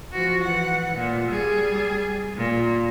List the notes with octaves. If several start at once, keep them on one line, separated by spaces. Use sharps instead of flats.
F3 F#4
E3 F#5
A#2
G3 G#4
A#2